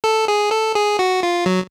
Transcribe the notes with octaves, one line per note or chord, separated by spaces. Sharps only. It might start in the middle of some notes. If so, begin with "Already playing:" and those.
A4
G#4
A4
G#4
F#4
F4
F#3